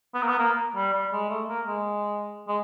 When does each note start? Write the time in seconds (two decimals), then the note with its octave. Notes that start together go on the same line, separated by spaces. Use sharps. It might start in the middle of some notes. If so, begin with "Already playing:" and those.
0.14 B3
0.22 A#3
0.28 B3
0.39 A#3
0.76 G3
0.93 G3
1.12 G#3
1.29 A3
1.48 A#3
1.66 G#3
2.48 G#3